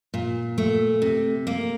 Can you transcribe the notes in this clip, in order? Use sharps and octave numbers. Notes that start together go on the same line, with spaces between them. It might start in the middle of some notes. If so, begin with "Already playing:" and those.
A#2
A3
C3
A#3